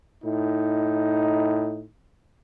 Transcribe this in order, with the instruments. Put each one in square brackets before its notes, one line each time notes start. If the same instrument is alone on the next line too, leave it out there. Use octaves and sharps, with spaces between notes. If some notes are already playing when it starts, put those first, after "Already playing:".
[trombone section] A2 D#4